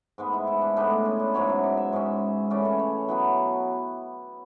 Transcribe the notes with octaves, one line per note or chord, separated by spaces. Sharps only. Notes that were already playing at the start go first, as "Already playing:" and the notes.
G#2 G#3 B3
E4
E4
D4
A2 G#3 B3 D4
D4
C#4
D4
G#2 F#3 C#4 C#5
E5
D5
E5
G#2 G#3 C#4
C#3 E3 A3 C#4 D5
C#5
C#5
B2 F#3 B3 E4